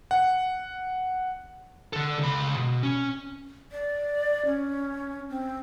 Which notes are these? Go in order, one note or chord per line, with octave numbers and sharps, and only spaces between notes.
F#5
D3 A4
C#2 B5
B2
C#4
D5
C#4
C4